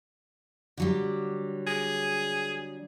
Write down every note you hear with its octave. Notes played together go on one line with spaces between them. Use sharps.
D3 F#3 G3
G#4